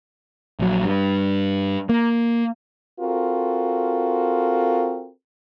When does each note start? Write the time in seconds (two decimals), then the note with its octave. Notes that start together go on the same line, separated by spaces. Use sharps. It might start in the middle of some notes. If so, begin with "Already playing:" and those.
0.59 A#1 F#3
0.85 G2
1.89 A#3
3.01 C4 F4 F#4 A4 A#4